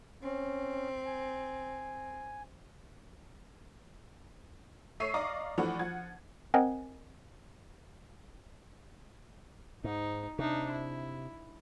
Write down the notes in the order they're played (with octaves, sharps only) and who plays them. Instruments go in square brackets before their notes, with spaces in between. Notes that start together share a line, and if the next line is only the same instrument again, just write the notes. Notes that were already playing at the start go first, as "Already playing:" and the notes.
[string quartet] C4 [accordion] C#4
[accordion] G#5
[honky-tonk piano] A3 C#5 E5 C#6 C7 D#7
D5 D#5 F5 A#5 C#6 D6
E3 F3 A3 D4 E4 F#4
F3 F#5 G#6
[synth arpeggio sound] C4 A#4 D#5 F#5 G#5
[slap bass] G#2 [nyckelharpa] D#4
[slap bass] C3 [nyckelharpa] D4 D#4
[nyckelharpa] E4